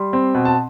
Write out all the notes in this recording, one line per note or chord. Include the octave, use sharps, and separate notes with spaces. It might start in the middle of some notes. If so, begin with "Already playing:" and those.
Already playing: G3 C6
C4
B2
A5